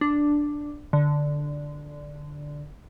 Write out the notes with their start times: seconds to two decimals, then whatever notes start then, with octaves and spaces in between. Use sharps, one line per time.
0.01 D4
0.93 D3